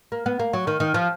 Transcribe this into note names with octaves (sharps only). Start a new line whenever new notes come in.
A#3
B3
A#3
F#3
D#3
D#3
F3